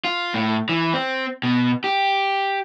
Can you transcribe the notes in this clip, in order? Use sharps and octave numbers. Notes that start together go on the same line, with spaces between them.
F4
A2
E3
C4
B2
G4